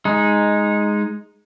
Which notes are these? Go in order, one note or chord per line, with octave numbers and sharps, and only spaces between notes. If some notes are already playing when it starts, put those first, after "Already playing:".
G#3 D#4